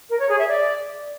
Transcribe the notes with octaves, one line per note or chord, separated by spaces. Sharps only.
A#4
C#5
G#4
E5
D5